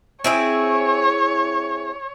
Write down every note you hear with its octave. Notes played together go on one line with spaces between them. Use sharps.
C4 E4 G#4 C#5